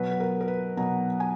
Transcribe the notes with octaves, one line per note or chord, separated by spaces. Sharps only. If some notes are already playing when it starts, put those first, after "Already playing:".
Already playing: B2 F#3 B4
B4
A#4
A#4
B4
B2 F#3 A#5
G#5